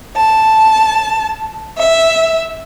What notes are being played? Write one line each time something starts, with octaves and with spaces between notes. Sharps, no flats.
A5
E5